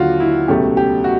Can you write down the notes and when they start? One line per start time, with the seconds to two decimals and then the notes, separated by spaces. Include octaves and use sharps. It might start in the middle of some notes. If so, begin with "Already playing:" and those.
Already playing: D#2 D3 F#3 F4 F#4
0.20 E4
0.48 C#2 B2 F#3 A3 G4
0.77 G4
1.04 F#4